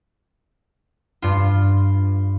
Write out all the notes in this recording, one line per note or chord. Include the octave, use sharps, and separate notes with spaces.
G2 F4